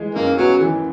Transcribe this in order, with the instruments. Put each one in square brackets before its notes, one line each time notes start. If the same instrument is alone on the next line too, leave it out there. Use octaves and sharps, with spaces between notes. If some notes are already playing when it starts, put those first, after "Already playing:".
Already playing: [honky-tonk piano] E3 G#3
[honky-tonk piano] F#2 [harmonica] A#3
[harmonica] F#3 [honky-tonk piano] B3
[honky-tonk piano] E3